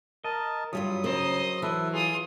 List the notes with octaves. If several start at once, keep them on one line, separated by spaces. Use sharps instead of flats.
A#4 D#5 A5
G2 F#3 G3 F4 D#6
C#3 A#4 C5 D#5
E3 A4 B4
F4 G#4 D#6